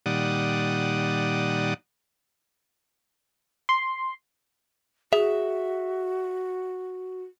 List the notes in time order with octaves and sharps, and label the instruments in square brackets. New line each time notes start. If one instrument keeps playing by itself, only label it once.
[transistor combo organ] A#2 D#3 G3 D5 F#5 D#6
[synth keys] C6
[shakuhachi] F#4 [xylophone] G#4 [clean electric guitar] E5